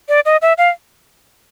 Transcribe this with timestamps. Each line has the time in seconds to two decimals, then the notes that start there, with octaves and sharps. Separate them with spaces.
0.09 D5
0.25 D#5
0.42 E5
0.58 F5